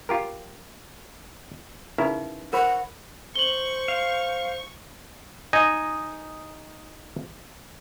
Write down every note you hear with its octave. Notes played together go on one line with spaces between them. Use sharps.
F4 G4 A#4
C#3 D#4 E4 A#4 B4
A#4 C5 F#5 B5
C5 C#6 F#7 G7
F5
D#4 D#5 G#5